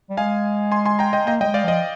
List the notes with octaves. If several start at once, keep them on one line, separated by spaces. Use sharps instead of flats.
G3
G#3 F5 G#5
G#5 C6
G#5 C6
G5 A#5
D#5 G5
A#3 D#5 G5
G3 D#5 G5
G#3
D5 F5
F3 D#5